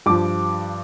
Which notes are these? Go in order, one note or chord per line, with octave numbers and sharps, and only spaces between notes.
G2 F3 D6